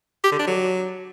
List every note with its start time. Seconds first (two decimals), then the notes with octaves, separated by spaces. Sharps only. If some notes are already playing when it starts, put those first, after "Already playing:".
0.24 G4
0.32 D3
0.39 D4
0.47 F#3